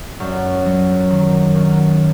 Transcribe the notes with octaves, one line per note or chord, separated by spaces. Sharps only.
F#2
F#3
D#3
F#2